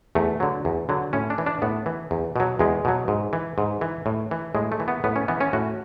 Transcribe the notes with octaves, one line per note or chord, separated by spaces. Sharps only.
E2 A3
D3 F#3
E2
D3 F#3
A2 C#4
D4
E3
D4
A2 B3
E3
E2
B2 F#3
E2 G#3
B2 F#3
G#2
E3
G#2
E3
A2
E3
A2 G#3
A3
E3
B3
A2 B3
C#4
E3 B3
C#4
A2 F#4